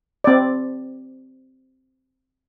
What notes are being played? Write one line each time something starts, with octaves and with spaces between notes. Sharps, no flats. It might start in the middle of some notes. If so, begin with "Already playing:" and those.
C4 D5